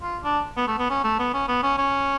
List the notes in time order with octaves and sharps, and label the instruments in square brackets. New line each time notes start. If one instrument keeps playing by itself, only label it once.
[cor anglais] F4
D4
B3
A3
B3
C#4
A3
B3
C#4
B3
C#4
C#4